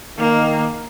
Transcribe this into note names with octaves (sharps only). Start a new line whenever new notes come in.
D#3 A#3